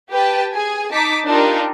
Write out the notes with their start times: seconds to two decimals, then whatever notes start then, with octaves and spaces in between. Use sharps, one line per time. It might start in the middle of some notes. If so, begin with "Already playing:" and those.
0.11 G4 B4 G5 A5
0.54 G#4 G#5
0.92 D#4 A5 D6 B6
1.26 D4 D#4 F4 G4 A#4